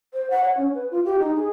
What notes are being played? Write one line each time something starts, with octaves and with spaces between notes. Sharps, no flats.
C5
F#5
C#5
C#4
B4
F4
G4
D#4
G#4